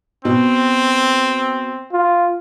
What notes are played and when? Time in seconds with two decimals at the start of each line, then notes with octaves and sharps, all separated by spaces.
0.25 B2 C4
1.92 F4